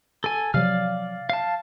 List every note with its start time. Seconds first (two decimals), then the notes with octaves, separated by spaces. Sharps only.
0.24 A4 G#5
0.54 C3 F3 F#3 D5 F5 F6
1.30 F5 A5